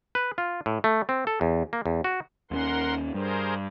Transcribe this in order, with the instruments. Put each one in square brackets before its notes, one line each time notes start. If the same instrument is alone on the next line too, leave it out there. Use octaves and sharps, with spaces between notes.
[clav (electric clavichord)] B4
F4
A2
A3
C4
A4
E2
A#3
E2
F#4
[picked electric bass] D#2 B3 C#4 [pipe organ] A#4 F#5 C6
[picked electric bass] G2 [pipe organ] G#4 A#4 C5